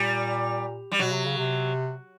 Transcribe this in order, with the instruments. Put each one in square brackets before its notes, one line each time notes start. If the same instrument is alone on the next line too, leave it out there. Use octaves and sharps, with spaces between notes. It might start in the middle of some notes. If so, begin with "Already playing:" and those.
Already playing: [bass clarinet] A#2 [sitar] G3
[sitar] G3
[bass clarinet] B2 [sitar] F#3
[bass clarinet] C3
C#3
C3